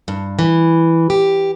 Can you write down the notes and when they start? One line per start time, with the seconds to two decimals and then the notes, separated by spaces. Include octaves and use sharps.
0.08 G2
0.39 E3
1.10 G4